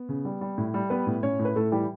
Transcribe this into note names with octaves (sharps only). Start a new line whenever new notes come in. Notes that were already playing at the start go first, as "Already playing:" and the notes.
Already playing: B3
C#3
G3
G3
A2
G3
G3 B3 B4
A2
A2 C#4 C#5
A2
B4
A2 A3 A4
E3 G3 G4